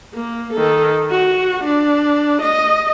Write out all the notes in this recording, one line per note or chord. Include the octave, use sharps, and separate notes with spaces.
A#3
D#3 A4
F#4
D4
D#5